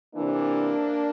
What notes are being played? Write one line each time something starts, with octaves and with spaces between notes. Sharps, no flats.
C3 E3 A#3 D4